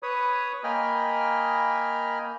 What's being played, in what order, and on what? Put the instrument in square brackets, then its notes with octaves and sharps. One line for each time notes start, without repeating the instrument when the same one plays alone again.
[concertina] B4 C#5 B5 D#6
A#3 D#5 G5 G#5 B5 F6